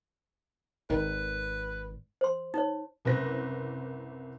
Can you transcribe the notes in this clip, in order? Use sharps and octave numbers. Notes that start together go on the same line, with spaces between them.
G#1 D#3 B4
C5 C6
D#4 C#5
F#1 C2 B4 C5 F#6 A#6